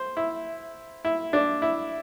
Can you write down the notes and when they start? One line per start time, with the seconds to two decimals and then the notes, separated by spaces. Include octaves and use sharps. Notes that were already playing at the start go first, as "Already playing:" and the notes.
Already playing: C5
0.17 E4
1.05 E4
1.33 D4
1.62 E4